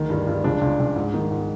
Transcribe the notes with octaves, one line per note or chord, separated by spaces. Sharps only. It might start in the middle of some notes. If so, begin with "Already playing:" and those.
Already playing: D2 D#3
G2
G2
C#2 D4
C#2
C#2
G#2
D#3
G#2